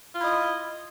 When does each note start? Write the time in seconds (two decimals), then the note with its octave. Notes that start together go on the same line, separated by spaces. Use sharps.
0.15 F4
0.19 E4
0.22 D#5